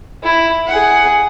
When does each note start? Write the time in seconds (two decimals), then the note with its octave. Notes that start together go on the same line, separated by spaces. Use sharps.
0.24 E4
0.68 G#4 F#5